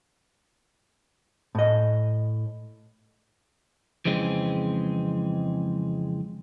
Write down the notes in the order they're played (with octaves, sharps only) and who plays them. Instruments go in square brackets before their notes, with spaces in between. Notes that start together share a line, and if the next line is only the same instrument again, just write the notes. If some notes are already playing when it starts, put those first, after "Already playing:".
[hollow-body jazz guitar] A2 D#5
[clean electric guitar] F2 C#3 E3 G#3 C4